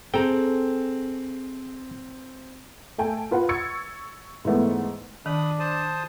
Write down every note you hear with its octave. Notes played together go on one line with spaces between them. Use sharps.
C4 G#4 A4 G5 A#5
A3 A4 G5 G#5
F4 B4 F#5
C#6 E6 G#6 A6 C#7
G#2 E3 A3 B3
D#3 D4 B5 D#6
C5 A5 D#6